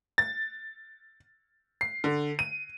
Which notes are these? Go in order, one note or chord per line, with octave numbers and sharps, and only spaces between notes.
A6
C7
D3
D#7